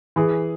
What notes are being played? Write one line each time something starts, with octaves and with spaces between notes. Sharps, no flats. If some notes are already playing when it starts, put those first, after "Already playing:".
E3 G#4